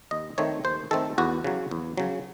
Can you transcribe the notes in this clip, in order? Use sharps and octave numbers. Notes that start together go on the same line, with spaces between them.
D#2 D#5
D#3 A3 C4 C#5
D#2 C5
D#3 A3 C4 A4
E2 F#4
C#3 F#3
E2
C#3 F#3